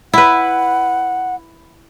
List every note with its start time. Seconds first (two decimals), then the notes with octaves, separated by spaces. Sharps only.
0.14 E4 B4 F#5